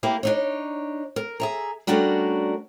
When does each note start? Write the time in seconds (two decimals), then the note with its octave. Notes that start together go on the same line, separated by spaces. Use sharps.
0.03 A#3 E4 G4
0.23 D4 D#4 C#5
1.16 A#4
1.40 G#4 E5 A#5
1.87 G3 A3 C#4 D4 F#4 A#4